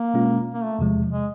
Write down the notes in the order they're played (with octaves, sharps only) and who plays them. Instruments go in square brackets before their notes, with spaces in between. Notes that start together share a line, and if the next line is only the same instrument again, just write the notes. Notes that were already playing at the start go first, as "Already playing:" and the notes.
Already playing: [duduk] A#3
[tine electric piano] B2 G#3 C#4 F4
[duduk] A#3
A3
[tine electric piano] E2 C3 F3 G#3
[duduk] G#3